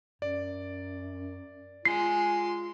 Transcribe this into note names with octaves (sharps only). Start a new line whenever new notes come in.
F#2 D5
G#3 F4 C6 C7